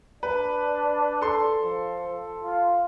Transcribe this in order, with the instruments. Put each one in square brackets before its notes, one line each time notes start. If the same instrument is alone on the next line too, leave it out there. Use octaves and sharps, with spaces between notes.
[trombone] D4 [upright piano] B4
[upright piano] A4 C6
[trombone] F3
F4